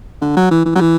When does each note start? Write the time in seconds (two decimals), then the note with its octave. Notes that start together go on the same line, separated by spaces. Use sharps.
0.21 D3
0.37 F#3
0.51 E3
0.65 E3
0.75 F#3
0.81 E3